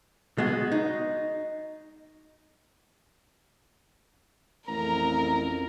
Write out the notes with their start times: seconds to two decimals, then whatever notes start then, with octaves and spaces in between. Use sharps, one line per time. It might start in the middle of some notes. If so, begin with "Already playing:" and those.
0.38 G#3 B3 F#4
0.72 D#4
4.68 A1 F2 A#4 A#5